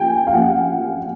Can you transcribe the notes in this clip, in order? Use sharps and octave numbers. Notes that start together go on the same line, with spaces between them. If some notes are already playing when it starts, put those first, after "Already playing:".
Already playing: F3 A#3 G5 G#5
F5
F3 A#3 C#4 F#5